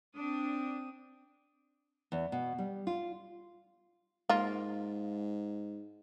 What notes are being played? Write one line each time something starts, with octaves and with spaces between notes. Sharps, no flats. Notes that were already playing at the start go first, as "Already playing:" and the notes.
C4 D4 D#6
E2
B2
G3
F4
G#2 A#3 F4